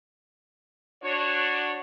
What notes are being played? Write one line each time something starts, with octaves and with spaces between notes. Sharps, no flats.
D4 F#4 C#5